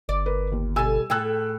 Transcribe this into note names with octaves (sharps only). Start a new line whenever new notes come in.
G1 D5
A#4 B4
D#2
B2 G3 A4 G#5 E6
A2 G#4 A4 G5 E6 F#6